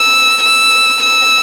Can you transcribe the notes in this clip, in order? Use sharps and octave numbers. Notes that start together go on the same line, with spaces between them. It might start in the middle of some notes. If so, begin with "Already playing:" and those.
Already playing: E6
E6
E6